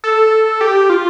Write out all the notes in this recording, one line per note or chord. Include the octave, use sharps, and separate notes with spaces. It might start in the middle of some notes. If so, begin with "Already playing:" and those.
A4
G4
F4